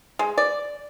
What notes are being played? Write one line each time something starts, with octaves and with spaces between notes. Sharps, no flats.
G#3
D5